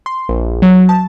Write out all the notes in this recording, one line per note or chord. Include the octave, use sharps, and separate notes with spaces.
C6
A#1
F#3
A5